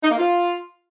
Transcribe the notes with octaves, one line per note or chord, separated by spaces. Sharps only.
D#4
A#3
F4